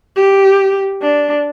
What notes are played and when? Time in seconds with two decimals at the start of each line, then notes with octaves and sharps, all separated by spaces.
0.16 G4
1.02 D4